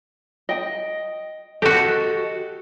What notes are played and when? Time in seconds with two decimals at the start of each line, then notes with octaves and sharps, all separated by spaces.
0.49 D#5 G5
1.62 F#4 G4 A4 D#5